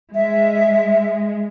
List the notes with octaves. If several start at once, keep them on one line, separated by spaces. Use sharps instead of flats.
G#3 E5